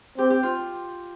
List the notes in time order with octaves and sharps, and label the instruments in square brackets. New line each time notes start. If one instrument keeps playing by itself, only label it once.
[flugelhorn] C4 [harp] G4
[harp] G4
F4